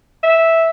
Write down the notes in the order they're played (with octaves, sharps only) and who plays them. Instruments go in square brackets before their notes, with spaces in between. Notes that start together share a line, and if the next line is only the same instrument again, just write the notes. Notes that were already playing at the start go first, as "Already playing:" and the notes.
[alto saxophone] E5